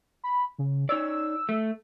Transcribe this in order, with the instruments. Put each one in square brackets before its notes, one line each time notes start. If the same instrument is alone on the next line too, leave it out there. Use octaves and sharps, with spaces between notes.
[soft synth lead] B5
C#3
[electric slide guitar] D#4 C#5 D5 [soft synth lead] E6
[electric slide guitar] A3